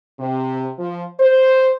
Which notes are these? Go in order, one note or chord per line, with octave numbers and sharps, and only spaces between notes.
C3
F3
C5